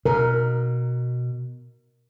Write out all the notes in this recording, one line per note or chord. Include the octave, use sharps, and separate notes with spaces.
B2 A#4